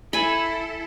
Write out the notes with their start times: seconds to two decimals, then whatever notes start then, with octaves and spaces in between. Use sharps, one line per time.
0.13 E4 A4 G#5 B5